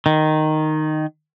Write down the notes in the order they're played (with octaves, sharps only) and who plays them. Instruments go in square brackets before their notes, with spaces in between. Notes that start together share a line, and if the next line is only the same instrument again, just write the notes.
[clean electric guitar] D#3